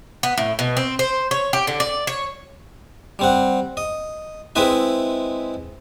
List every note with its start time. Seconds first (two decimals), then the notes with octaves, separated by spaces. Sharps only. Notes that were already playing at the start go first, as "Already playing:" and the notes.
0.23 B3
0.38 A2
0.59 B2
0.77 C4
0.99 C5
1.31 C#5
1.53 G4
1.67 D3
1.80 D5
2.07 C#5
3.19 G3 C4 F#5
3.77 D#5
4.56 G#3 C4 E4 B4 D#5 E5